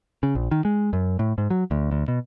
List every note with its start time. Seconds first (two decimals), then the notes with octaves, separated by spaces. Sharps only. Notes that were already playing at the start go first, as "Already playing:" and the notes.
0.23 C#3
0.35 A#1
0.51 D#3
0.65 G#3
0.93 F#2
1.19 A2
1.38 G#2
1.50 F#3
1.71 D2
1.91 D2
2.08 B2